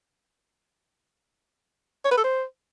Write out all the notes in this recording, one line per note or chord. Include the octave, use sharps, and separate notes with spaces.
C#5
B4
A4
C5